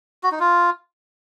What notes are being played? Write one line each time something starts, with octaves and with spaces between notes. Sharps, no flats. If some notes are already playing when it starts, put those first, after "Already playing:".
F#4
D#4
F4